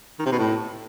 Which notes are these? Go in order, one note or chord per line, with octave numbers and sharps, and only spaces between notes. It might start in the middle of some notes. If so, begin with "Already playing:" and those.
D#3
C3
B2
A2